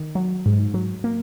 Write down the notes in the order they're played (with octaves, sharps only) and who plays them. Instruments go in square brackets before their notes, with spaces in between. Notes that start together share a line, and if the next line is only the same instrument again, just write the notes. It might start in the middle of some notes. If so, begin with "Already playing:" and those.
Already playing: [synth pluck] D#3
F#3
G#2
F#3
A#3